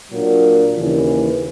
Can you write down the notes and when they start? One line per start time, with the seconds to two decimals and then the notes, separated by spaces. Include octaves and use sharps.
0.10 A#2 F#3 A#3 D4
0.76 D#2 C#3 E3